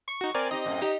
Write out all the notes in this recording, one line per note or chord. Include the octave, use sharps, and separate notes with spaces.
C#6
D#4 F#4
C4 A#4 D5 G#5
D#4 G4 D#5
F#2 A2
D#4 G4